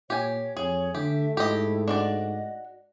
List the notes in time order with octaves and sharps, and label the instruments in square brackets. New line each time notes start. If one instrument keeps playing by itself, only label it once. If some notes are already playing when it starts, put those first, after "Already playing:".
[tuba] A#2 [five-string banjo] G4 G#5 [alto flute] C#5
[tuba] F2 [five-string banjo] G#4 [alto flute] C#5
[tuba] D3 [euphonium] A3 [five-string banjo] G4 [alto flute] E5
[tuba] G#2 [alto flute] E4 [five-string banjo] G4 D#5
[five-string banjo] D4 F#4 D5 [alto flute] D#5